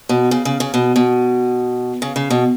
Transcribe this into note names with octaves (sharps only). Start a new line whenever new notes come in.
B2
C#3
C#3
C#3
B2
B2
C#3
C#3
B2